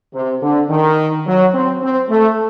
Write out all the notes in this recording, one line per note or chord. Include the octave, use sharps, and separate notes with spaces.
C3
D3
D#3
F#3
C4
C4
A3